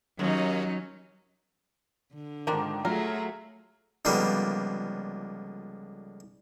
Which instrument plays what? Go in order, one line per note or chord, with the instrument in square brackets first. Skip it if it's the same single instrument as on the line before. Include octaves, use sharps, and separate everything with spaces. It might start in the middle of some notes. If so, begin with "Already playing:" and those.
[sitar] D#2 [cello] F#3 [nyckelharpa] C#4 D#4
[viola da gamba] D3
[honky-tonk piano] G#2 D#3 [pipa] F3 A#3 D4
[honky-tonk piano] F#3 F4 [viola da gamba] A3 G#4 [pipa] A#4
[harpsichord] C#2 D3 F3 G3 A#3 B3